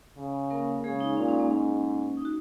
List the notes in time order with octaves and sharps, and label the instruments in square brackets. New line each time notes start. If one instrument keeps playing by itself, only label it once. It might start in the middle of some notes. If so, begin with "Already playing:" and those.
[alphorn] C#3
[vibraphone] A#3 A#4
[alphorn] C#3 [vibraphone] G#3 G#4
[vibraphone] D#4
[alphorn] A#2 [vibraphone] C#4
[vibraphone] C#4
A#3
[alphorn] G#2 [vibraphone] C#4
[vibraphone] D#4
F#4